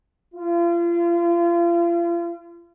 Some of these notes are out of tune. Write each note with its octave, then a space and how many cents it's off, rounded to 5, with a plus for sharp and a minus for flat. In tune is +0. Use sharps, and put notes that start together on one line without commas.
F4 -35